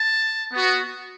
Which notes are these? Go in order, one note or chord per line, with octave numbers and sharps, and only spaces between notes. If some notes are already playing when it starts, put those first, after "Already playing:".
Already playing: A5
B3 F#4